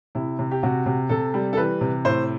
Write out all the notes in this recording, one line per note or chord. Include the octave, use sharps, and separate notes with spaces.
C3 E4
C3
G4
C3 F#4
C3
C3 A4
G3
A4
E3 B4
C3
A2 C5